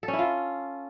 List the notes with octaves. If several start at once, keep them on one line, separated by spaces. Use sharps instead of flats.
A4
C#4
E4
F4